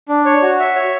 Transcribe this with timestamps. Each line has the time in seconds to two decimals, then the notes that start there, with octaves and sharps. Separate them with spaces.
0.09 D4
0.25 C#5
0.42 F#4
0.60 E5
0.76 C#5